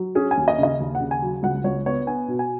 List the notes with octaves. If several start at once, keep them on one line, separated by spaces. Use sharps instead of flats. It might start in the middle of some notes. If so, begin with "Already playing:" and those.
Already playing: F#3
C#4 G#4
G#5
D#2
D#5
C#3 D#5
D#2
F#5
C#3
G#5
F#3
C#2 F#5
C#2 C#5
B3 C#5
B3 G#5
B2
G#5